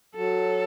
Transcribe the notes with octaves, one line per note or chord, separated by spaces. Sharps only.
F#3 A4